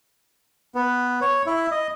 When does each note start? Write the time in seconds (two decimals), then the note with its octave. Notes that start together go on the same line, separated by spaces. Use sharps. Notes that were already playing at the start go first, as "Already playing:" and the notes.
0.75 B3
1.21 C#5
1.46 E4
1.71 D#5